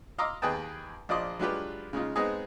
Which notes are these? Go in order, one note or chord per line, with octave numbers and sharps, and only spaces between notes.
D#5 F5 A#5 C6 D6 E6
D#2 G#4 B4 D#5 G5 A5
A#1 F3 D5 D#5 C6
F#3 G#3 D4 F4 G4 B4
C#3 G#3 D#4 F4
G#3 B3 C4 D#4 G#4 D#5